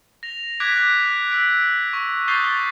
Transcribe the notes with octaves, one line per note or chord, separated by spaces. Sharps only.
A#6 F7
D6 F#6 G#6 B6 D7
E6 B6 D7
C#6
C#6 D#6 G6 A6 C7 G7
A6 G7